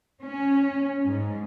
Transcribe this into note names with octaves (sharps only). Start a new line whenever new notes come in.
C#4
G#2